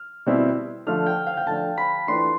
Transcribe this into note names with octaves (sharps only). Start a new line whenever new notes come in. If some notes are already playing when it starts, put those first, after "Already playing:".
Already playing: F6
B2 G3 C4 E4
D3 F3 A3 D4 F6
G5
F5
G5
D3 F3 A3 D4 A5
B5
E3 A3 D4 F4 B4 C6